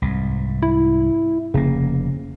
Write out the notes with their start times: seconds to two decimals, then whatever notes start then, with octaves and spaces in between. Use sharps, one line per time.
0.02 C2 G#2
0.63 E4
1.54 F1 C#3 A#3